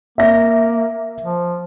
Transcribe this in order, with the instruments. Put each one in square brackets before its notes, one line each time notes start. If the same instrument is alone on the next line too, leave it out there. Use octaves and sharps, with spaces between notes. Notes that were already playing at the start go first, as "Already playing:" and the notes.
[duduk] A#3 [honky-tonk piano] E5 A#6
[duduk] F3